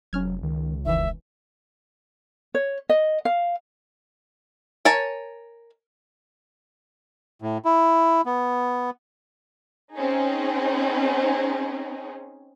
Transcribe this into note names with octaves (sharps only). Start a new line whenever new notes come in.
F1 F#3 C#4 F6 G#6
C#2 D#3
E1 D#3 E3 E5
C#5
D#5
F5
A#4 C#5 G#5 A5
A2
E4
B3
C4 C#4 D#4 G#4